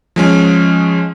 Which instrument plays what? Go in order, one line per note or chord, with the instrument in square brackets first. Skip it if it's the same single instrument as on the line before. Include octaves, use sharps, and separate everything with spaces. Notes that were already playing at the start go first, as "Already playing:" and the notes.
[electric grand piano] F3 G#3 C#4